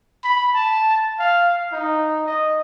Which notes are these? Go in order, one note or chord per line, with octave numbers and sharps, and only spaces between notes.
B5
A5
F5
D#4
D#5